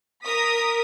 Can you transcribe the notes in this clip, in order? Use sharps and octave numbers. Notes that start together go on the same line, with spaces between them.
A#4 D#6 B6